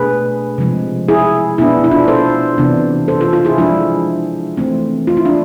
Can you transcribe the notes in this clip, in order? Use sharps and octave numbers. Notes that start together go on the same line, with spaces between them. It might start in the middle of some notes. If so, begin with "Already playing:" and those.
Already playing: B2 A3 D4 G#4 B4
C3 F3 G#3
E4 G#4
B2 B3 D4 E4
E4
D4 F4
A4 C5
C3 E3 B3 D4
A4 C5
F4 A4
F4 A4
E4 G#4
F3 G#3 D4 E4
E3 A3 C4
F4
E4
D4 F4